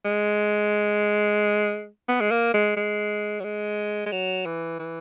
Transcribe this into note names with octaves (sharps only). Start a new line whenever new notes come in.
G#3
B3
G#3
A#3
G#3
G#3
F#3
G#3
G#3
F#3
E3
E3